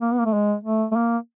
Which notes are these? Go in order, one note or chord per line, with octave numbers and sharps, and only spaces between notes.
A#3
B3
A#3
A3
G#3
A3
A3
A#3